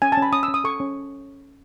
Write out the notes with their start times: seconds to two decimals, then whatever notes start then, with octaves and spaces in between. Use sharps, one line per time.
0.02 C#4 G#5
0.12 A5
0.17 C#4 B5
0.33 C#4 D#6
0.43 E6
0.48 C#4
0.54 D#6
0.64 A4 C#6
0.80 C#4